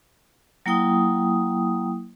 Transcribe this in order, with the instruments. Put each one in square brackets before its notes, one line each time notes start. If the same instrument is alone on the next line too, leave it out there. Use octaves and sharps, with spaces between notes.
[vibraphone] F#3 A#3 E4 G5 D#6